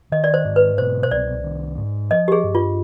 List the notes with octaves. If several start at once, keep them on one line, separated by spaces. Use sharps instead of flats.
D#3 D#5
D5
C5
G#2
B4
B2 C5
C5
C2 D5
D#3
G#2
F3 D#5
G4
G#4
G2
F4